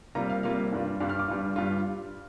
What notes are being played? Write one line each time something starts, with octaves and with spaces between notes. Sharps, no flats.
C3 G3 A#3 F4 A#5
F5
C3 G3 A#3 F4 F5
G2 G3 D4 F4
G2 G3 D4 F4 F5
F6
D6
G2 G3 D4 F4
G2 G3 D4 F4